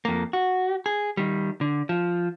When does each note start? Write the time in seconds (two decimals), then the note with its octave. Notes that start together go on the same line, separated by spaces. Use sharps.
0.05 F2 A#3
0.33 F#4
0.86 G#4
1.17 D#3 G3
1.61 D3
1.89 F3